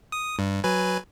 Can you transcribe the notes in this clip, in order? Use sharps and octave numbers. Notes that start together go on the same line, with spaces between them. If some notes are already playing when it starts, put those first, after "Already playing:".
D#6
G2
F#3 B4 G#5